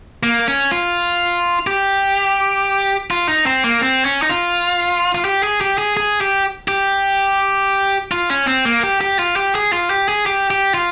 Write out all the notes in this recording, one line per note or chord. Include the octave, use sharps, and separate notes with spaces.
A#3
C#4
F4
G4
F4
D#4
C4
A#3
C4
C#4
D#4
F4
F4
G4
G#4
G4
G#4
G#4
G4
G4
F4
C#4
C4
A#3
G4
G4
F4
G4
G#4
F4
G4
G#4
G4
G4
F4